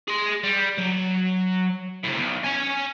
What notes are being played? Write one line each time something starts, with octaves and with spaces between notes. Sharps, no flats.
G#4 C6
G3
F#3
A2 C3
B1
C#4 G#5